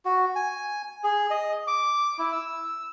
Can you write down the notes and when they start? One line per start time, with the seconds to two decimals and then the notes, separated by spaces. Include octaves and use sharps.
0.05 F#4
0.36 G#5
1.04 G#4
1.30 D#5
1.67 D6
2.19 E4
2.32 E6